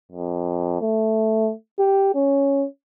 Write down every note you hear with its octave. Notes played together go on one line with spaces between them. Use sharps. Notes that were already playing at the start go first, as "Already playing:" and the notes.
F2
A3
G4
C#4